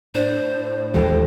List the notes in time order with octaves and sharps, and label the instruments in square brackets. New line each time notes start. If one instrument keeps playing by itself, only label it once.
[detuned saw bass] A2 [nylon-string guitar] D4 [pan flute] C5
[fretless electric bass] D#2 E3 G#3 [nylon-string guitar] G4 A4 [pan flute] C5